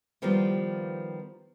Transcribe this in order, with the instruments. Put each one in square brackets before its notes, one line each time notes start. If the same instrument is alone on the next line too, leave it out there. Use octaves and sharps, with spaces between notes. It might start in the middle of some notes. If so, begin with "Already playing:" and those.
[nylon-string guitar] D#3 F3 G3 A#3 B3 F4